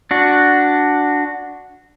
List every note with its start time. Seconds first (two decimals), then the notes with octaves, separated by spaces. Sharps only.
0.11 D4 F#4